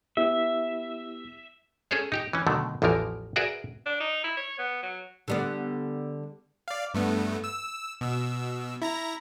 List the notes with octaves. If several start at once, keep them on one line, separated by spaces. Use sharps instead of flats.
B3 E4 G4 E5
C#4 G#4 A4 C5 C#5
D#4 G4 G5
E3 C#4
B2 D3 D#3 F#3 A3
A1 E2 E3 F3 A#4
F#4 G#4 A#4 B4 D5 E5
D4
D#4
E4
C#5
B3
F#3
D3 G3 B3
D5 F5
G2 A3 B3
E6
B2 E6
E4 A#5 A#6